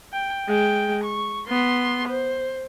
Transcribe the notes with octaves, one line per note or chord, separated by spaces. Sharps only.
G5
G#3 G5
C#6
B3 C6
C5